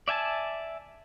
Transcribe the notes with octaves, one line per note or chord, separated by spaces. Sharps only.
D5 E5 G#5 A5